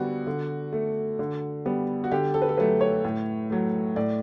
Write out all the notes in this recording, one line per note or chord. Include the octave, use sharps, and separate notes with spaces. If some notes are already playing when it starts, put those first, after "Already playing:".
Already playing: D3 G3 B3 F#4
D3
A3
D3
G3 B3
F#4
D3 G4
A4
B4
A4
F#3 A3 B4
C#5
A2
F#3 A3
A2 D5